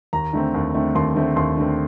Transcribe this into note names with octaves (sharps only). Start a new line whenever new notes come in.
D#2 A#5
D3 A3 C4
D#2
D3 A3 C4
D#2 C6
D3 A3 C4
D#2 C6
D3 A3 C4